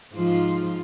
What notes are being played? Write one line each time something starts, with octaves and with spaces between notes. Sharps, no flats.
G#2 F3 F4